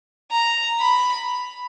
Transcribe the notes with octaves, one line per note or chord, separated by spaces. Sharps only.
A#5
B5